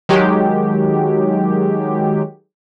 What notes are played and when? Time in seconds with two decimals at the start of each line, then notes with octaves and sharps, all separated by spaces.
0.09 D#3 F#3 G#3 G4